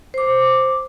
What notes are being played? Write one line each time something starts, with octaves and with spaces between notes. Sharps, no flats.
C5 D6